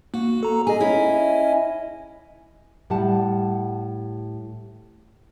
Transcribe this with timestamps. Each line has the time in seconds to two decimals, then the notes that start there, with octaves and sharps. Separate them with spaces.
0.14 A#3 F#4
0.43 A4 A#5
0.67 G#4 D#5 G#5
0.80 C#4 E4
2.90 A2 G3 F#5 A5